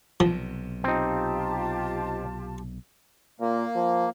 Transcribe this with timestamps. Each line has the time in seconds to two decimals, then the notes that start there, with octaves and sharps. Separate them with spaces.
0.20 B1 C3 F3
0.84 C4 D#4 F4 G4 A5
3.40 A#2 A#3
3.75 F3